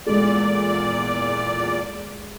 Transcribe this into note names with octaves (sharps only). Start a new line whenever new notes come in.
E2 A#2 G#3 A4 D5